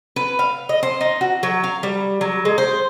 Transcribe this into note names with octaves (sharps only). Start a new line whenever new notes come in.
B4
F5
D#5
C5
D#4
F#4
F#3
F5
G3
F#3
G#3
C5